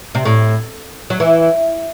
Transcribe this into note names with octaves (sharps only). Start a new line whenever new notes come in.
C3
A2
F#3
E3